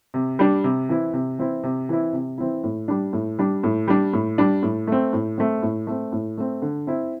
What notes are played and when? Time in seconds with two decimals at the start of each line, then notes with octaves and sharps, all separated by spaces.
0.14 C3
0.39 G3 D4
0.64 C3
0.89 E3 C4 E4
1.13 C3
1.39 E3 C4 E4
1.64 C3
1.89 E3 C4 E4
2.13 C3
2.38 E3 C4 E4
2.63 A2
2.88 G3 D4
3.13 A2
3.39 G3 D4
3.63 A2
3.88 G3 D4
4.13 A2
4.38 G3 D4
4.63 A2
4.87 A3 C4
5.13 A2
5.38 A3 C4
5.62 A2
5.87 A3 C4
6.12 A2
6.38 A3 C4
6.62 D3
6.87 C4 E4